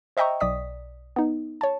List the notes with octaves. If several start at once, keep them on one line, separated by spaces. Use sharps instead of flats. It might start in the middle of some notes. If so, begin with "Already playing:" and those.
C5 D#5 E5 G5 A#5 C#6
B1 D5 D#6 B6
B3 D#4
C#5 A5